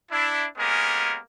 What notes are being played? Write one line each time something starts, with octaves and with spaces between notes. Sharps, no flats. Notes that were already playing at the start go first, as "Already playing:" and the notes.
D4 E4
G#3 A#3 B3 C#4 G4 A#4